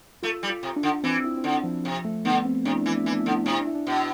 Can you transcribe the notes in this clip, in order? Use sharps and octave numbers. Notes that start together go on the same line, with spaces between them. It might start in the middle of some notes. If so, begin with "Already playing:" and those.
A3 F4
G3
F4
C3
D4
D3
E3 C4
E4
C4
D3 D4
F3
C3 F3
A3
D3 B3
C4
C3 D4
E4
D4
E3
E4
D4
E3 E4
D4
E4
D3 D4
E4
C3 D4
E4
D4
E4
D4
B2